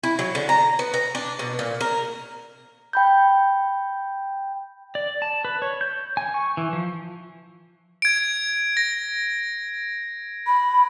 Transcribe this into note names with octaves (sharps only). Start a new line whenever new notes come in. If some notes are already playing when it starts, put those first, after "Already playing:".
E4
F#3
D3
A#5
B3
A#5
D4
B2
A#2
A#4
G5 B5 G6
D5
A5
B4
C#5
G6
G#5
C#6
E3
F3
G#6 D7
A#6
B5